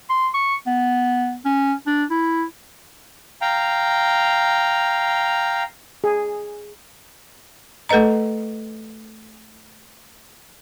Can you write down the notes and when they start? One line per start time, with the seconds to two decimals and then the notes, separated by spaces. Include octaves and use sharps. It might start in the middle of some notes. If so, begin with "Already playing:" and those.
0.10 C6
0.34 C#6
0.67 B3
1.45 C#4
1.87 D4
2.10 E4
3.41 F5 G5 A#5
6.04 G#4
7.89 A3 A4 B4 D#5 A#5